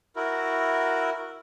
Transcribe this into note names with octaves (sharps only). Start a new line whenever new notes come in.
E4 F#4 A#4